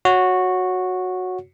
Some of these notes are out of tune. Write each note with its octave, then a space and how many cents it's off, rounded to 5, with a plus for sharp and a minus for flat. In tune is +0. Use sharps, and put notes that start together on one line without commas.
F#4 -10 C#5 +0